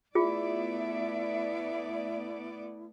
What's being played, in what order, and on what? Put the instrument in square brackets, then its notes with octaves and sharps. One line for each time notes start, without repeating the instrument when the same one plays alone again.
[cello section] A3 B3 D5 [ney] E4 [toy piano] F4 G#4 [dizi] E5